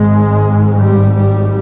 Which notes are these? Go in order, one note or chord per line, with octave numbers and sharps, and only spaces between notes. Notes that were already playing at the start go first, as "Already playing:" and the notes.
Already playing: G#1 G#2 G#3
G3
G3